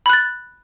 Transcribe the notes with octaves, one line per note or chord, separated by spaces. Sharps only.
B5 F#6 A6